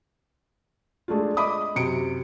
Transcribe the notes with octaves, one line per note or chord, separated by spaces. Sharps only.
G#3 A3 D4 F4
D#5 E5 B5 D6 D#6
F#2 C3 C#7 D7